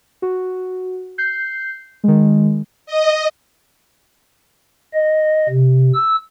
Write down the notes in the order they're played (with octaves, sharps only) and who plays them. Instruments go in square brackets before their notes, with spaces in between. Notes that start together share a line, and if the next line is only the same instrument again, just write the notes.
[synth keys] F#4
G6 C7
D#3 G#3
[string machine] D#5
[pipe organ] D#5
C3
E6